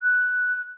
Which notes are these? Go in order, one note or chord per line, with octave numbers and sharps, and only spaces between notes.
F#6